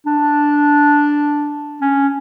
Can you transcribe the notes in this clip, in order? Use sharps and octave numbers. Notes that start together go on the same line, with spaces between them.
D4
C#4